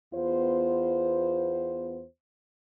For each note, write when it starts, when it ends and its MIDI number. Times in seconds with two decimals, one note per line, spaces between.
0.14 2.05 40
0.14 2.05 59
0.14 2.05 65
0.14 2.05 72